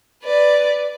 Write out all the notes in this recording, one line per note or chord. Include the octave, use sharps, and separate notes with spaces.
B4 D5